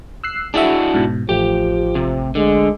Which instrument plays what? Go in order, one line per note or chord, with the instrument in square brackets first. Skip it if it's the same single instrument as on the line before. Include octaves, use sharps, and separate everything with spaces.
[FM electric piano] E6 F#6 C7
[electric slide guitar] D4 E4 F#4 [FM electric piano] G#4 E5
[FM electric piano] G#2 B2
[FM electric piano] A1 A3 [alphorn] F3 [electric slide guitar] G4
[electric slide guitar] C3
[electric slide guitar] D3 [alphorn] G#3